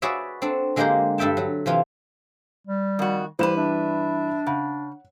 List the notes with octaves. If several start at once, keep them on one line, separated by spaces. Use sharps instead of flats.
F#4 G#4 B4 C#5 D5 E5
C4 D4 A4
D3 G#3 A#3 G4 A#4 C5
G2 A4 E5 G5 A5
F#3
C3 E3 F4
G3
F2 D#3 F#4
G2 E3 G3 B4 C5 E7
D4 E5
C#3 F#5